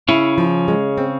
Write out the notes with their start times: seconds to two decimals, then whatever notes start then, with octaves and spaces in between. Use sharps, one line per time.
0.09 C#3 C#4 E4
0.38 F3
0.68 G#3
0.98 C4